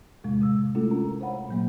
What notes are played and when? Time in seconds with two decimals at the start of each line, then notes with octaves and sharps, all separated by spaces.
0.23 E2 A2 C3 G#3
0.41 C#3 G#3 E6
0.75 G#3 A3 C#4 E4 F4 A4
0.90 D4 A#4 A#5
1.21 C5 C#5 F5 F#5 A#5 B5
1.49 A#2 F#3 A#3